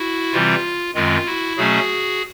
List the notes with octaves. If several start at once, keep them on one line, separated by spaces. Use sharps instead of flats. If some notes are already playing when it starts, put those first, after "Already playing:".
Already playing: E4 F#4
C3 E3 G3 C4 F4
F#2 D#3 G#3 C4 F4
E4 F#4
B2 F#3 A3 C#4 F#4 G#4